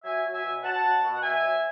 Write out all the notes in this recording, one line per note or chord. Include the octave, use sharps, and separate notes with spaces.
F#3 E5 G#5
F#3
E5 G#5
B2
F#3 F#5 A5
B2
B2
F#5
B2 E5 G#5
F#3